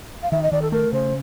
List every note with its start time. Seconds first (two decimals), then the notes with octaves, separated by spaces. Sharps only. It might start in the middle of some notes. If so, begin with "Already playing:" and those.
0.23 F5
0.32 D#3 E5
0.43 D#5
0.52 D#3 D5
0.62 A4
0.71 A3 A#4
0.92 C#3 C5